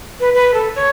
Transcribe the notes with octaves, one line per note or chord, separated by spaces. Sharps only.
B4
B4
A4
C#5